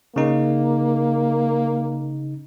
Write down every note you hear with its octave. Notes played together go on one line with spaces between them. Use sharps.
C#3 A#3 D#4